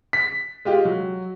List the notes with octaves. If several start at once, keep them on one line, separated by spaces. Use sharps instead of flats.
B6
G#3 F4 G4
F#3